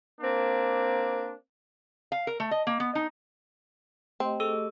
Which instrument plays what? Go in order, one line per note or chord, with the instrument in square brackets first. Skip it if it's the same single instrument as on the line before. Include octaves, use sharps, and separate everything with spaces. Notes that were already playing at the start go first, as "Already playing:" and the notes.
[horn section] A#3 C4 D4
[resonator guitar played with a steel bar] F5
A#4
A3
D#5
A#3
B3
D#4
[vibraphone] A3 G4 D#5 [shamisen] C4
[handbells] G#4 A4 E6